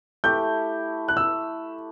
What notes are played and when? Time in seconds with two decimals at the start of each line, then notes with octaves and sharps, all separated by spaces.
0.24 A3 E4 G4 G6
1.08 F#6
1.17 E6